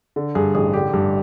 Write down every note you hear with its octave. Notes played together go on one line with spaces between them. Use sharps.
D3
G2 G#4
A1 G#4
D3 G4
G2